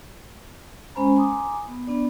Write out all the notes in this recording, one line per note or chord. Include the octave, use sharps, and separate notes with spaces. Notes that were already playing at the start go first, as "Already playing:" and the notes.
G#3 C#4 C5 G#5 A#5 B5
G#5 A#5 C6 D6 D#6
B3
B3 D4 D5